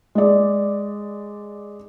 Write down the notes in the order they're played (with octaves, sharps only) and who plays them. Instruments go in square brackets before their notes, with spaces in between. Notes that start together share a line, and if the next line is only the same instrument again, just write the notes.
[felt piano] G#3 D5